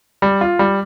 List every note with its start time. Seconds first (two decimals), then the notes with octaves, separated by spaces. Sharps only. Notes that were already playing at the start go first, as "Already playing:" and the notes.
0.22 G3
0.41 F4
0.59 G3